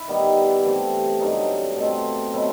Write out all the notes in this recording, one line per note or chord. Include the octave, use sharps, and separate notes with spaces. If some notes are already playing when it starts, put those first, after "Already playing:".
Already playing: E4
D#3 G3 B3
C3 E3 A3
G2 F#3 A3 D#4
B2 A3 C4
B2 F#3 A3 C4 E4